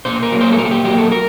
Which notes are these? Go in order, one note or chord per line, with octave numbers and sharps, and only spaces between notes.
A#2 C5
A#4
F#3 A#3
C5
A4
A#2 A#4
A4
G4
F#3 A#3 G4
A4
A#4